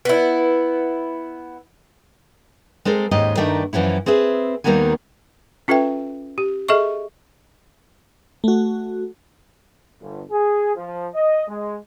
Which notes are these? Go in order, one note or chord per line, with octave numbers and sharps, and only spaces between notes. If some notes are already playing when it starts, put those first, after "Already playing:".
B3 E4
G#3 C4 A4 A#4
D#2 G#2 C#4 G4 D#5
G2 D#3 A3 D#4 A#4 D5
F#2 E3 F3 C#4 E4
C4 G#4 B4 E5
D#2 D#3 G3 A#3 B3 G#5
C#4 F4 A4 B4 E5 G5
G4
G#4 A4 D#5 E5 C#6
A3 F#4
G1
G#4
F3
D#5
G#3